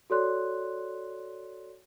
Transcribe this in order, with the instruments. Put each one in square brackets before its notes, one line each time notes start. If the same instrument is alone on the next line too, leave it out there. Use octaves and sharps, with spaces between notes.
[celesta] F#4 A4 C#5 D5 C6 F#6